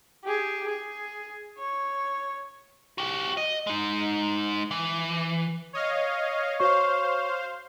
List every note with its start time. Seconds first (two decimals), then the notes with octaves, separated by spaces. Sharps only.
0.24 G4 G#4
0.68 G#4
1.58 C#5
2.98 F#4 G4
3.37 D#5
3.67 G#3 D#4
4.71 E3
5.73 C#5 D#5 F5
6.60 F#4 C5 C#5 F5 C#6